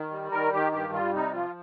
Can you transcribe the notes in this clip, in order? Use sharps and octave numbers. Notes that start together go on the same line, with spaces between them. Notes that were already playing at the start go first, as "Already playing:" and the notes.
Already playing: D#3
G3
D#3 A#4
D#3 G4
G2 G4
G3 F4
C3 D#4
F3 F4